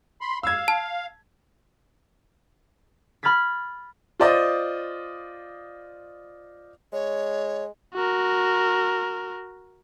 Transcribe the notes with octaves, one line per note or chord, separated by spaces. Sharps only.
B5 C6
F5 E6 G#6
A5
B5 F6 G#6 A6 B6
F4 C5 D5 D#5 D#6
G#3 C#5
F#4 A#4